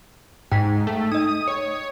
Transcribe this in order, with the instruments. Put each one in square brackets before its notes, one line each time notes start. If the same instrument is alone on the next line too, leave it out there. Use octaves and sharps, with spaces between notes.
[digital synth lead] G#2 [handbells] G5 B6
[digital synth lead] A3
[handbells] D#4 D#5 [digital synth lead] D#6
[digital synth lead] C#5